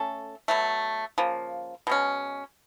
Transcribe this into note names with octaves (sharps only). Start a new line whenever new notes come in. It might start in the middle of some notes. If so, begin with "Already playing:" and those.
Already playing: A3 C#4 A4
B2 F#3 A3
C#3 F3 A#3
B2 G#3 C#4